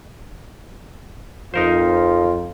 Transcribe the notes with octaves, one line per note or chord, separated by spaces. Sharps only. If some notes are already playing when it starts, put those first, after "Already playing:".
F2 D#4 F4 A#4 C5